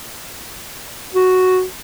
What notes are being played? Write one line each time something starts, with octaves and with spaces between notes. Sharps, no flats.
F#4